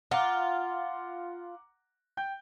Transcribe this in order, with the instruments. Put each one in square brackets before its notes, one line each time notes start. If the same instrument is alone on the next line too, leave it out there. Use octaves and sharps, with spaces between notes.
[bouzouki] F4 [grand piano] F#5 A#5 D6
[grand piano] G5 G6